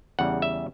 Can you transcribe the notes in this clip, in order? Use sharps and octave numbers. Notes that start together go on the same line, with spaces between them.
E2 C#3 G3 F#5
E5